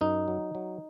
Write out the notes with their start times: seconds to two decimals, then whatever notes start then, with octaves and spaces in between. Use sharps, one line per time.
0.01 F#2 D#4
0.28 F#3
0.55 F#3